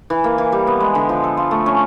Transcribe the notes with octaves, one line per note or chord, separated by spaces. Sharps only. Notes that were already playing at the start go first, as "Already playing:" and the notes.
E3
A#3
E3
G3
B3
G#3
D3
F3
A4
F4
A3
C#4